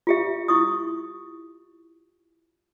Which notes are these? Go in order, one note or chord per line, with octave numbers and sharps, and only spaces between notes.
F4 G4 E5
E4 C#6 D#6